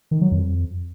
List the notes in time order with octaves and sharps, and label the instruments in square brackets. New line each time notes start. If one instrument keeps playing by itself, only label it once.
[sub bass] D#3
F#3
F2